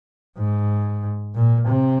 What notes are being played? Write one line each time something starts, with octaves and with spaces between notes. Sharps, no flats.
G#2
A#2
C3